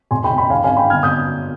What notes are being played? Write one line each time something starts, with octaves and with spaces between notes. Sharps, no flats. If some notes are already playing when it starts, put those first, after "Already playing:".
F1 G#5 C6
G5 B5
F1
G5 B5
G#1 F5 G#5
F5 G#5
G#1
G5 B5
G1 F6 G#6
D#6 G6